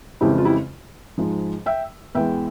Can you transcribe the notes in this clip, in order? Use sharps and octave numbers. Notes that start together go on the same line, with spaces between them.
F2 C#3 E3 G#3 E4 G4
F4
E4 G4
G#2 F3 G#3
E5 G5
E2 E3 G#3 E5 G5